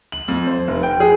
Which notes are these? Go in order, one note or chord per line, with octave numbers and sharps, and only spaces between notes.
F#7
F2
C5
F1
G5
G#4